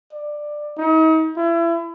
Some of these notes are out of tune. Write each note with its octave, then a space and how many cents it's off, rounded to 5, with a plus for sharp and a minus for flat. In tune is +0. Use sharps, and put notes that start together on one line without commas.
D5 +15
D#4 +40
E4 +30